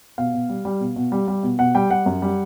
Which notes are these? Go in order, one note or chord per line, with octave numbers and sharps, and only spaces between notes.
B2 F5
B2
G3
G3
B2
B2
G3
G3
B2
B2 F#5
G3 G5
G3 F#5
F#2
G3